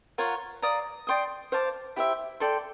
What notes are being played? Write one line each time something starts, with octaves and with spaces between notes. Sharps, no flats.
F4 A#4 C#5 F#5
D5 F5 A#5 D#6
D5 G5 C6 D#6
C5 F5 A5 D6
E4 G4 C5 E5
A4 D5 G5 C6